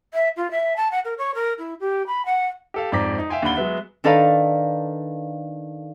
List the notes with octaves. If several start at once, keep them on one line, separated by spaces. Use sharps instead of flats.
E5
F4
E5
A5
F#5
A#4
C#5
A#4
E4
G4
B5
F#5
G4 A4 F5
F2 G#2 D5 A#5 D6 B6
D#4
E5 F5 G5 G#5 C6
D#2 D3 F#5 B5 G7
F#3 G#3 B3 E5 F#6
D#3 D4 A4 B4 F5 A#5